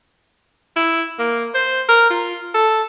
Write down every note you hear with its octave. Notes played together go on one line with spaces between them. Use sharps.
E4
A#3
C5
A#4
F4
A4